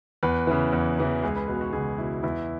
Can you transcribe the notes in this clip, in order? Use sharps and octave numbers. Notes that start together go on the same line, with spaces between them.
E2 B4
C#3 E3
E2
C#3 E3
C#2 G#4
B4
B2 B4
F#4
C#2 G#4
B2 E4
E2 E4